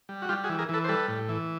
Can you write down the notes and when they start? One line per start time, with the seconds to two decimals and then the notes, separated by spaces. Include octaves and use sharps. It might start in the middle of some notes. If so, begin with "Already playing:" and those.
0.09 G3
0.22 F#4
0.29 G3 F4 G4
0.44 F#4 G#4
0.49 E3
0.59 G#4 A#4
0.69 E3 A4 B4
0.84 C5
0.88 G3 A4 B4
1.08 A2
1.29 E3